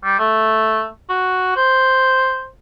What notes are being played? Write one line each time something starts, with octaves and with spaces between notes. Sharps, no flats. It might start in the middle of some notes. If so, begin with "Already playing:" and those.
G3
A3
F#4
C5